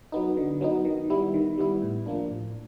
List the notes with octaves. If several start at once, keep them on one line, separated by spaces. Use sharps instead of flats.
F#3 B3 D#4
D3
F#3 B3 D#4
D#3
G3 B3 E4
D#3
G3 B3 E4
A2
F3 A#3 D4
A2